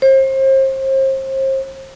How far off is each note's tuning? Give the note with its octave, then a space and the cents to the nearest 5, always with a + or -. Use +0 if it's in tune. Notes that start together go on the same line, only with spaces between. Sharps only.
C5 +35